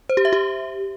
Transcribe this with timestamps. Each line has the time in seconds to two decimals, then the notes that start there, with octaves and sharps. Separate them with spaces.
0.09 C5
0.17 G4
0.25 E5
0.33 G4